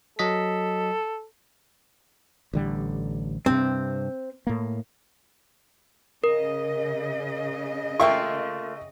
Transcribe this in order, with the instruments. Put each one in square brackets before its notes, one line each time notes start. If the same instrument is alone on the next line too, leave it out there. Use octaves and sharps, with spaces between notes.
[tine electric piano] F#3 D#5 B6 [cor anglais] A4
[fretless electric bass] A1 D3 G3
[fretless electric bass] G2 C3 [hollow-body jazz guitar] C4
[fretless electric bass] A2 A#3
[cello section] C#3 D#5 [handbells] A#4
[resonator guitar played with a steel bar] A3 A#3 F4 [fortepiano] E5 G5 C#6